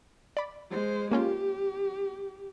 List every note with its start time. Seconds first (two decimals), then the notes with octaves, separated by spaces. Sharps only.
0.37 D5 B5
0.70 G#3 C5
1.11 A#3 C#4 F4 G4